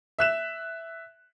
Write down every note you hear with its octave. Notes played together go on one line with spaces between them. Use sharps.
E5 F#6 E7